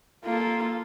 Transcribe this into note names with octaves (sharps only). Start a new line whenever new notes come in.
A#3 F4 A4